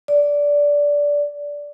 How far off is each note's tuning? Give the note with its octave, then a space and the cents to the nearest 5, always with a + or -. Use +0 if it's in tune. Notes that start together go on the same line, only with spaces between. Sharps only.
D5 -15